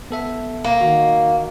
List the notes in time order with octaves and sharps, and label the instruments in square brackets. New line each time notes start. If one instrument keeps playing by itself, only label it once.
[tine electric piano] B3 A4 E5
[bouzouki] A#3
[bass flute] D#3 [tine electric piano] F#4